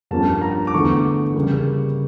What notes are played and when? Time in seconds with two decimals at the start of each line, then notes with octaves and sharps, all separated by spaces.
0.11 G2 F3 A#3 C#4 A5
0.41 A#5
0.67 D6
0.74 E2 D3 A3 C#6
1.35 C#3 G3 A#3